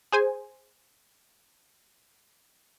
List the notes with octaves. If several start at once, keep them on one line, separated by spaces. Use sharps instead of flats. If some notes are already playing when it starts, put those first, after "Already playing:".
G#4 C5 G#5